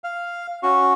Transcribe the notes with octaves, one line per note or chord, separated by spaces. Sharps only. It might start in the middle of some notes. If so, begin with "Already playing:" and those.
F5
C#4 F#4 C#6